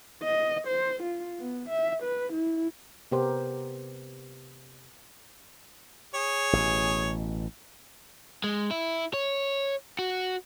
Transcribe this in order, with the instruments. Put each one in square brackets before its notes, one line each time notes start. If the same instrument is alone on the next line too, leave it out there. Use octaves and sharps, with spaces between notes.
[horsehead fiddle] D#5
C5
F4
B3
E5
B4
E4
[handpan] C3 B3 G4 A#4 C5
[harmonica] G#4 C#5
[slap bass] A1 B2
[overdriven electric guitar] G#3
E4
C#5
F#4